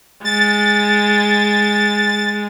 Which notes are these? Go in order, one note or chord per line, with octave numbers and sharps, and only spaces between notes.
G#3 A6